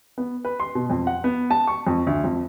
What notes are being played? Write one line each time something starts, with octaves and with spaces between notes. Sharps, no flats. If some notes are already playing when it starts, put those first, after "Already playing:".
B3
B4
C6
B2
F2
F#5
B3
A5
C#6
F2
D2
F2